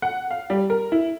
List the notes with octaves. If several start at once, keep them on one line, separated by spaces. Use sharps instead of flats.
F#5
F5
G3
A#4
E4